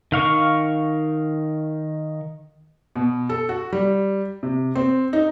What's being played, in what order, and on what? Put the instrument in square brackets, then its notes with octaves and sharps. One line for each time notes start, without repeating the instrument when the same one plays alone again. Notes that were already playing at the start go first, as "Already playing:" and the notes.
[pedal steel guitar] D#3 F5 C#6
[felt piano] B2
A4
F#4
G3
C3
C4
D#4